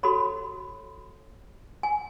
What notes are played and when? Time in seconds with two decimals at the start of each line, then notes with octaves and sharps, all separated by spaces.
0.03 F#4 A4 C#5 B5
1.83 G#5